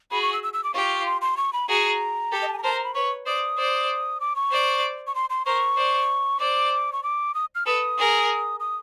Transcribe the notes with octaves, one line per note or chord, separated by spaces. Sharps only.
F#4 G#4 B5
C#6
E6
E6
E6
D6
F4 G4 C#6
C6
C6
C#6
B5
F#4 G#4 A#5
G4 A4
D#5
A5
G#5
A#5
A#4 C5 A5
A#5
B5
B4 C#5 C#6
C5 D5 D#6
C5 D5
D6
C#6
C5 D5
C#6
C6
C6
A#4 C5 C#6
C5 D5
C5 D5 D6
C#6
D6
D#6
F6
A4 B4 D#6
G#4 A#4
D#6